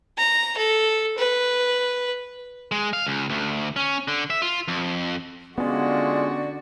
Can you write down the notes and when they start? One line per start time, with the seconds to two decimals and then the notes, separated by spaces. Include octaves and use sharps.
0.18 A#5
0.57 A4
1.18 B4
2.72 G#3
2.93 F5
3.07 C#2
3.29 D2
3.76 C#4
4.08 D3
4.30 E5
4.42 F4
4.68 F2
5.58 D3 G#3 B3 C#4 F4 F#4 D5